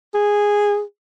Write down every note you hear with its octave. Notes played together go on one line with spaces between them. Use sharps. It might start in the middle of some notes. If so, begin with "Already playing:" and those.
G#4